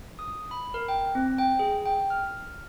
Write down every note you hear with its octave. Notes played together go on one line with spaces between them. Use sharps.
D#6
B5
A#4
G5
C4
G5
G#4
G5
F6